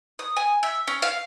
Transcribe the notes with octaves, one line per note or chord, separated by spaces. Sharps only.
D#6
G#5
E5
C#4
F5